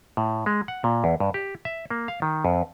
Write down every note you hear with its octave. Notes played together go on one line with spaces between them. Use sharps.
A2
G#3
F#5
A#2
E2
G2
G4
E5
A#3
F5
D#3
F2